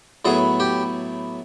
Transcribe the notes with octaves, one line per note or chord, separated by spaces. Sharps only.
A2 F#3 B3 G#4
G4